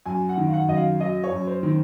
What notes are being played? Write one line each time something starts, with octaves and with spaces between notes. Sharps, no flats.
F#2 G#5
F#5
D#3
F5
F#5
F#2 D#5
F5
F#3 D#5
C#5
F#2
C5
D#3